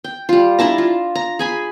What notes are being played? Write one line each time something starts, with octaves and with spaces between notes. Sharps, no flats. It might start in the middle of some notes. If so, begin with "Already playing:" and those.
G5
G3 F4
D4 E4 A5 A#5
F4
A#5
G#4 G#5 B5